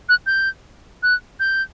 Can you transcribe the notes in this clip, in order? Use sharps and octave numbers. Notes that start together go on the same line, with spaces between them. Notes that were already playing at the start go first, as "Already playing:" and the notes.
F#6
G6
F#6
G6